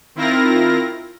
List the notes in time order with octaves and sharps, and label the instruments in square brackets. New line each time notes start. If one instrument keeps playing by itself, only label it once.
[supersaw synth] D#3 C4 E4 F4 A#4 A#6